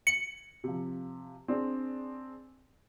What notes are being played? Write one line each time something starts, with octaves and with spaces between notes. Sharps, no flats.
C#7 F#7
C3 F3
C4 D4 G#4